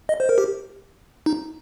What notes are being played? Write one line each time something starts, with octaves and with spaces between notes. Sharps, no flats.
D#5
C5
A#4
G4
D#4